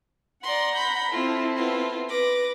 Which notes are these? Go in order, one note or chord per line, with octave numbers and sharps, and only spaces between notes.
D5 F#5 A#5 C6
B5 G6
C4 E4 F4 A4
B3 F4
B4 D6 A#6